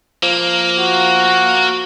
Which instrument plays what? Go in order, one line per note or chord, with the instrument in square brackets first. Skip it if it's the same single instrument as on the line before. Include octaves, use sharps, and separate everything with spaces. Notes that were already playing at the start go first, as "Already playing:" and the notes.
[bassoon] F3 [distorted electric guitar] A#3
[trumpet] F#4